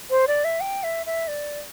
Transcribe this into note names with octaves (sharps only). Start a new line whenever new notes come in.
C5
D5
E5
G5
E5
E5
D5